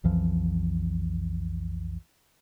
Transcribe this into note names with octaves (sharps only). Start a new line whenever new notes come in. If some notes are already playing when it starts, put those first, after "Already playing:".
B1 F2 E3 F3